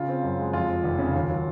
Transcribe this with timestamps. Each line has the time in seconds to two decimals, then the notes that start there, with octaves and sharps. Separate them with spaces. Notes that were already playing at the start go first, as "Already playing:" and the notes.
Already playing: C#3 F4
0.08 C4
0.23 F#2
0.38 G#3
0.53 F2 F4
0.69 F3
0.84 F1
0.99 C#3
1.15 D#2
1.29 F#3